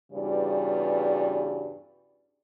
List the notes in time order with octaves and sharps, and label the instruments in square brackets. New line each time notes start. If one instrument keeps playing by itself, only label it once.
[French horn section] E2 G2 C#3 G3 F#4 D5